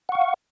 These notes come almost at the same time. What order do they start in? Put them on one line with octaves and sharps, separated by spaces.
F#5 C#6 F5